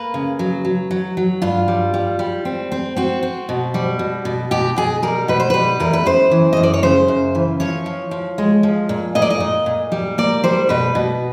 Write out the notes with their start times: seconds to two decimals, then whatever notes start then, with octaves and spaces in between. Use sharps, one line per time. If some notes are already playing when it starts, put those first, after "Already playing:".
Already playing: A#3 B4
0.14 C#3
0.39 F#3
0.65 F#3
0.91 F#3
1.17 F#3
1.42 G2 F4
1.68 G3
1.94 G3
2.19 G3
2.45 C4
2.72 C4
2.96 C4 F#4
3.23 C4
3.49 B2
3.74 G3
3.99 B2
4.25 B2
4.51 B2 G4
4.76 B2 G#4
5.02 G3 A#4
5.28 B2 B4
5.40 C5
5.50 G3 B4
5.80 E2 A#4
5.93 B4
6.05 F#2 C5
6.31 E3
6.53 F#2 D#5
6.63 D5
6.74 C#5
6.83 C#3 C5
7.08 F#2
7.35 E3
7.60 F3 C#5
7.86 F3
8.11 F3
8.38 G#3
8.63 F3
8.89 A#2
9.15 A#2 D#5
9.22 D5
9.30 D#5
9.40 A#2
9.66 A#2
9.92 G3
10.18 A#3 D5
10.44 G3 C5
10.69 B2 B4
10.95 B2